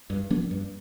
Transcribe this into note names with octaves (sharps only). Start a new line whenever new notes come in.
G2
F3 A#3 D4
G2